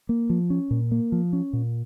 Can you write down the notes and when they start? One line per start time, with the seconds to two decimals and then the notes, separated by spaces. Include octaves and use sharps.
0.09 A#3
0.30 F3
0.50 C#4
0.71 A#2
0.92 A#3
1.12 F3
1.33 C#4
1.53 A#2